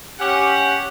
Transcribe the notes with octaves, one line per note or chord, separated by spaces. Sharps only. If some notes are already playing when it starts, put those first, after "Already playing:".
C#4 G4 F#5